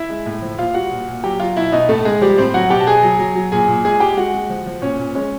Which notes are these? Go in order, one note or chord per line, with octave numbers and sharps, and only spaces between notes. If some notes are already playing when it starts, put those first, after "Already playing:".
Already playing: E4 E5
G#3
A2
F3
A#2 F4 F5
G3 F#4 F#5
A#2
A#2
F#3 G4 G5
F#3 F4 F5
B2 E4 E5
B2 D#4 D#5
A2 A3 A4
G#3 G#4
F3 G3 G4
A2 C4 C5
F#3 F#4 F#5
B2 G4 G5
A5
B2 G#4 G#5
F#3
F#3
F#3
A#2 G#4 G#5
A#2
G#3 G#4 G#5
G#3 G4 G5
G#3 F#4 F#5
G#3
F3
F3
A#2 C#4 C#5
A#2
G#3 C#4 C#5